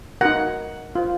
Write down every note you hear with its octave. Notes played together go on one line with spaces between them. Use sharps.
D#4 F#4 A#4 F#5
F4 C5